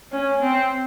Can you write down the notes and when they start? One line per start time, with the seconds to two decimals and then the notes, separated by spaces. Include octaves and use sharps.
0.13 C#4
0.42 C4